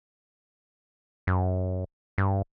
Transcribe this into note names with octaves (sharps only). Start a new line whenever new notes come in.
F#2
G2